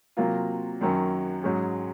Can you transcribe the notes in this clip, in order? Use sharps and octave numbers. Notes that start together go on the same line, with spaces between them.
C3 F#3 A#3 F4
F#2 D#3 F#3 C#4
G#2 F#3 C#4 G#4